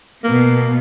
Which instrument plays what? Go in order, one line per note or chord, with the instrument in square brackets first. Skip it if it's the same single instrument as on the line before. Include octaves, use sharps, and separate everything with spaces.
[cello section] B2 B3 [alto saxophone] A#3